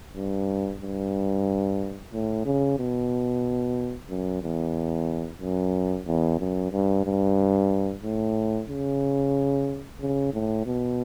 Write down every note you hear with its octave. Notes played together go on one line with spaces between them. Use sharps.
G2
G2
A2
C#3
B2
F#2
E2
F#2
E2
F#2
G2
G2
A2
C#3
C#3
A2
B2